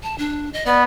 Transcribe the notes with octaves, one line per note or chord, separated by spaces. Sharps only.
A5
D4
D#5
B3 D5